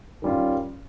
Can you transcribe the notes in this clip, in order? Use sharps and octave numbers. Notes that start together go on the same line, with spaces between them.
D#3 G3 C#4 F4